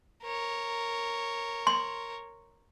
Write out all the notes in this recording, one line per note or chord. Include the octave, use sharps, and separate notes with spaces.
A#4 C#5
C6